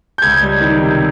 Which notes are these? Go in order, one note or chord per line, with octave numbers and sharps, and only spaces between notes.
G6
C#2 G#6
G3
D#3
C3